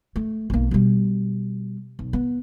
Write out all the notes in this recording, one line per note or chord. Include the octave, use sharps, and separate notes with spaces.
A3
B1 A#3
B2 G3
B1
B3